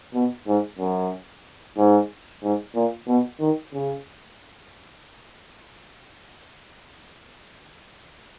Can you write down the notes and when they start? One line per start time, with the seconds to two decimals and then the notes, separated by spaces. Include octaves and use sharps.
0.14 B2
0.47 G#2
0.79 F#2
1.77 G#2
2.43 G#2
2.75 A#2
3.08 B2
3.40 D#3
3.73 C#3